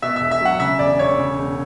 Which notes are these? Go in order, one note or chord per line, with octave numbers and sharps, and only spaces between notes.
B2 E5
E1 E5
E5
F#3 F#5
C#3 E5
E1 D5
E1 C#5
C#3
E1